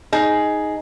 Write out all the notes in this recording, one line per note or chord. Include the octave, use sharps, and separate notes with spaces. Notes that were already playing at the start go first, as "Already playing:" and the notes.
D#4 G#4